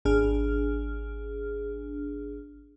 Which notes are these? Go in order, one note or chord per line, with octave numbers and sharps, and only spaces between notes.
G#1 D4 G#4 F6